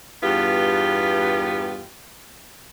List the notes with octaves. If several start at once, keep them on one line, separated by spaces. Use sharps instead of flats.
E2 G2 B3 F4 G4